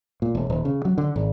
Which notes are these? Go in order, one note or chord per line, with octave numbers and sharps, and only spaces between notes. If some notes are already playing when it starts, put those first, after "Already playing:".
A#2
E1
D#1
C#3
F#3
D3
G#1